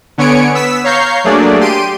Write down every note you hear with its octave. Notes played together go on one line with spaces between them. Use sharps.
D3 B3 C#5 G#5 C#7 D7
B3 E6 B6
C#5 F5 A#5 C#6 G6 C7
F#3 A3 A#3 D4 G#4 D5
G4 C6 D7 D#7